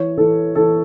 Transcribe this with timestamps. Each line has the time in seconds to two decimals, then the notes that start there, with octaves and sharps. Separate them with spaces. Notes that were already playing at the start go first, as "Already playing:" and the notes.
Already playing: E3 C#5
0.17 E3 A4
0.55 E3 A4